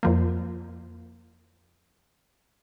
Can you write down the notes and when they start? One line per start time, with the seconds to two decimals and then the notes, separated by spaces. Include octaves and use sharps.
0.03 F2 F3 A#3